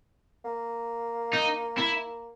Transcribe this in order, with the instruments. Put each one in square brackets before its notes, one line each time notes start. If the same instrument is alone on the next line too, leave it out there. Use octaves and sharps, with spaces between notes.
[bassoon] A#3
[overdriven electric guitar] D#4
E4